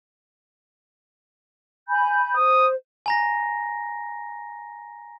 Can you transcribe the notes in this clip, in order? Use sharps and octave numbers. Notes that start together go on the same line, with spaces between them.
G#5 B5 G6
C5 D#6
G#5 A#5 A#6